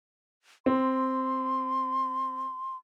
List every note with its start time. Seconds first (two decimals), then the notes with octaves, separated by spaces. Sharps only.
0.66 C4 C6